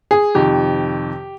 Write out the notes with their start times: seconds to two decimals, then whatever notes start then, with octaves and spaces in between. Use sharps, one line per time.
0.11 G#4
0.35 F2 C3 D#3 G4